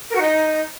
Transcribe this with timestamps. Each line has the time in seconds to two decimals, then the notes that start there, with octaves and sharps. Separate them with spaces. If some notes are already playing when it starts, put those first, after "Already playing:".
0.10 A#4
0.15 F#4
0.20 D#4